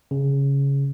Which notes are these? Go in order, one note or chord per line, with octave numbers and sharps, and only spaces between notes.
C#3